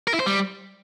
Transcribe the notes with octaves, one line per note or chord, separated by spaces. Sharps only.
A#4
E4
C5
G3